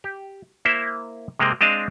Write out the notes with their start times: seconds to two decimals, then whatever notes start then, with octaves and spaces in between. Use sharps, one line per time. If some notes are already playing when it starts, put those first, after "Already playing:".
0.04 G4
0.65 A#3 E4 C5 E5
1.39 C3 G#3 A#3 C4
1.61 G#3 C4 D4 D#5 F5 A5